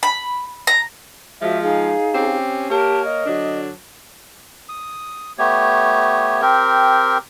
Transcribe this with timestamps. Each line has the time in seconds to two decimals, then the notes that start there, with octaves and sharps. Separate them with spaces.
0.03 B5
0.67 A#5
1.41 F3 G#3 F#4 E5
1.62 D#4 G#4 F5
2.13 C4 C#4 G4
2.70 A#3 G4 A#4 C#5 A5
3.04 D#5
3.26 D3 F#3 D4
4.69 D#6
5.38 A3 B3 G4 C#5
6.42 C4 G4 A#4